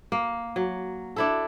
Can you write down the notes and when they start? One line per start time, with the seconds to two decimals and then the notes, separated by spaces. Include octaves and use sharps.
0.12 A#3
0.56 F#3
1.16 D4 E4 A4